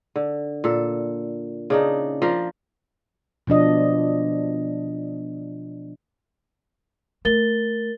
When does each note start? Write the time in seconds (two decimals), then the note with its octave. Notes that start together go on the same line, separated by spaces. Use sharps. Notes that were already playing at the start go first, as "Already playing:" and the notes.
0.16 D3
0.64 A#2 A4
1.70 C#3 D4 D#4
2.22 F3 F4 A#4 D5
3.47 B2 F3 D4 D#5
7.25 A3 A#4 A6 G7